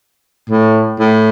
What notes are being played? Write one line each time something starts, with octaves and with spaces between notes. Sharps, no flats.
A2
A2